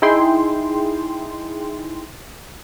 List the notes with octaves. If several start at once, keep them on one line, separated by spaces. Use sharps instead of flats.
D#4 E4 G#4 G5 C6